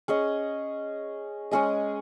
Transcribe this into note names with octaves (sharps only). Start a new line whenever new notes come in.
C#4 G#4 D#5
G#3 C#4 G#4 D#5